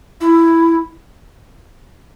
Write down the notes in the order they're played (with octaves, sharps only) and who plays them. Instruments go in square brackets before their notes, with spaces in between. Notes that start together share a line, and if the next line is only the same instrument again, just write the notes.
[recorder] E4